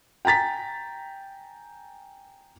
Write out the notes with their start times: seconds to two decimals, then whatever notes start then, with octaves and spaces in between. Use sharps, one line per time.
0.25 G5 G#5 A#5 A6 B6